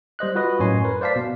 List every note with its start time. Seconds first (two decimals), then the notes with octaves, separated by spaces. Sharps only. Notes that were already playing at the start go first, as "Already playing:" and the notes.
0.19 G3 C5 D#5 F#6
0.35 F4 F#4 B4 D#5
0.59 F#2 A2 C#5 G#5 C6
0.84 A#4 B4
1.01 C5 D5 F5 A5 B6
1.16 B2